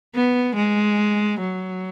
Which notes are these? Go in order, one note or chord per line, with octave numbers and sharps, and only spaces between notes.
B3
G#3
F#3